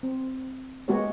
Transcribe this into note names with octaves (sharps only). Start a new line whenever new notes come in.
C4
G#3 A#3 B3 F#4 G4 C#5